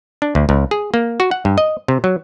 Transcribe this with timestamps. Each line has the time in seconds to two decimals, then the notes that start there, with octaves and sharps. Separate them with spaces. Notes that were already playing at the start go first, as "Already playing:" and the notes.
0.22 D4
0.35 D2
0.49 C#2
0.71 G#4
0.94 A#3
1.20 F#4
1.31 F#5
1.45 G2
1.58 D#5
1.88 C3
2.04 F#3